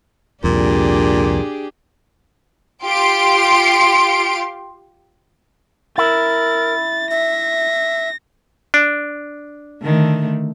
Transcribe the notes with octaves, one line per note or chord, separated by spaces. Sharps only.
C2 F2 A#2 D4 G4 G#4
F4 G4 C6 D7
E4 A#4 A6
E5 A#6
D4
D3 D#3 A3